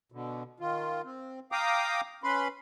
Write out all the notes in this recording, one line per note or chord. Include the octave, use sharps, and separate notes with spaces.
B2 D3
D#3 F4
C4
F5 G5 A#5 D6 D#6
C#4 B4 B5 C6